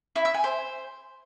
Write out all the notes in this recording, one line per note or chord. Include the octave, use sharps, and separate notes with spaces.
E4
E5
G#5
C5